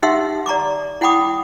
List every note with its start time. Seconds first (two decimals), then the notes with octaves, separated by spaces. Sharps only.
0.02 D#4 G4 E5 F#5 C6 E6
0.46 D5 A#5 C#6 D6
1.01 E4 F#5 G5 B5 D6 D#6